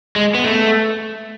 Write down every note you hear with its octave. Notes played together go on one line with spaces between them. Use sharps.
G#3
B3
A3